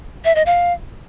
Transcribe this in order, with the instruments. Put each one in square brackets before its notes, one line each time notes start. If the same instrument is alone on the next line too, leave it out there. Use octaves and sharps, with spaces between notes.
[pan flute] E5
D#5
F5